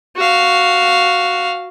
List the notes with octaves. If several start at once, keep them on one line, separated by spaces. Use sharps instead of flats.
F#4 F5